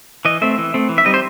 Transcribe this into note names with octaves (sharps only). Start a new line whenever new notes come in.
E3 D#5
A3 C4 E5
E3
A3 C4
E3
E5
G3 C4 D#4 D#5
C5